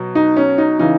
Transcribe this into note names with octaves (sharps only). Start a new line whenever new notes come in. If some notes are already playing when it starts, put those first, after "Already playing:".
Already playing: B2 F#3
D#4
C#4
D#4
C#3 E3 D#4